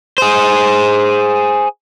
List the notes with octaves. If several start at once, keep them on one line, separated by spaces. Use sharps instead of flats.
G#4 C5